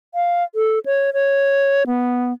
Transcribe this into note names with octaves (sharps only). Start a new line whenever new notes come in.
F5
A4
C#5
C#5
B3